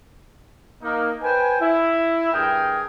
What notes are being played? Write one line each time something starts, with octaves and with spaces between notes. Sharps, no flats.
A#3 D#4
B4 C5 G5 G#5
E4
G2 G#4 A#4 G5